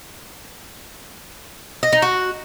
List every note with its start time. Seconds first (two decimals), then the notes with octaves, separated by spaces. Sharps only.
1.83 D#5
1.93 D#4
2.02 F#4